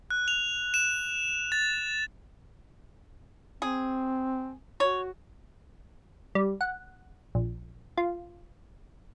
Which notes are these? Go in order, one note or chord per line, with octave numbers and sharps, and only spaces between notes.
F#6
F7
E7
A6
C4 G#4
F#4 C#5
G3
F#5
A#1
F4